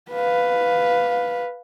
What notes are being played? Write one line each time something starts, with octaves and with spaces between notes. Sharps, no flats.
B4 F5